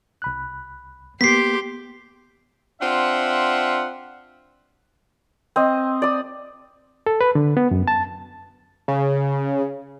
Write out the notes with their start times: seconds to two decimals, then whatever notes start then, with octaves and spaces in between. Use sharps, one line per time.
0.22 C2 B5 F#6
1.21 A#3 B3 G4 C6 D6 B6 C7
2.81 C4 D4 F4 E5 F#5
5.56 C4 D#5
6.02 D5 D#6
7.06 A4
7.21 B4
7.35 D3
7.57 B3
7.71 F#2
7.88 A5
8.88 C#3